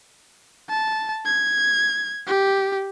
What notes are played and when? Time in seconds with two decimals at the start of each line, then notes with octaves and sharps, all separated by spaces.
0.70 A5
1.26 G#6
2.27 G4